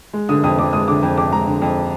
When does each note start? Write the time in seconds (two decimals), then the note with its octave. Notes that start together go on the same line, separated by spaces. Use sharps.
0.13 G#3
0.29 D3 D#6
0.44 F2 D#6
0.59 F2 D6
0.73 G#3 D#6
0.88 D3 D6
1.03 F2
1.17 F2 D6
1.32 G#3 A#5
1.47 D3
1.62 F2